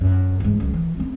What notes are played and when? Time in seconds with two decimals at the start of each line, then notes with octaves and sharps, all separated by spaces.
0.01 F#2
0.40 E2 G#2
0.60 C#2 F#3
0.73 E3
0.97 C4 C#4